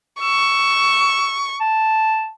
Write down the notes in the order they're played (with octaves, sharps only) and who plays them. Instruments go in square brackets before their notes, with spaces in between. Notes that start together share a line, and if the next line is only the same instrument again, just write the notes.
[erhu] C#6 [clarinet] E6
[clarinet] A5